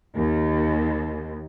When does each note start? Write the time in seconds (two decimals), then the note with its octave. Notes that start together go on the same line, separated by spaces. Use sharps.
0.16 D#2